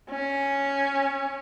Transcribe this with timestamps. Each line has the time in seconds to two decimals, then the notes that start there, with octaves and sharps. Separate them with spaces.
0.10 C#4